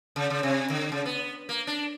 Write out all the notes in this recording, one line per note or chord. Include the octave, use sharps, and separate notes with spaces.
C#3
C#3
C3
D3
C#3
B3
A#3
D4